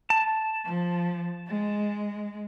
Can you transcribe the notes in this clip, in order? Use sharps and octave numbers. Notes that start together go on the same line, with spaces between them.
A5
F3
G#3